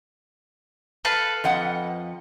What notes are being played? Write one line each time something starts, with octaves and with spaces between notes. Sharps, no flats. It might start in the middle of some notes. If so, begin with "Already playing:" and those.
A4 B4 F5
F2 D#5 F#5